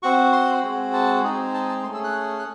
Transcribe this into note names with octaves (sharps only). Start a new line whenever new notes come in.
C4 F#4 C#6
C6
G#3 C4 F#4
A5
G#3 C4 D#4 G#4
A5
A5
A3 C#4 G#4 C6
E6
F#6
F#6